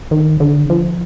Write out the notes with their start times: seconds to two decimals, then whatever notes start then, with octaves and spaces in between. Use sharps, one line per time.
0.11 D#3
0.40 D3
0.70 F3